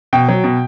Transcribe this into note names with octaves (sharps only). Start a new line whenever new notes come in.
B2 G5
F#3
B2